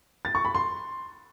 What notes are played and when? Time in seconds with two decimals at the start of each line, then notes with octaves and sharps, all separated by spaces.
0.25 A6
0.35 C#6
0.45 B5
0.55 C6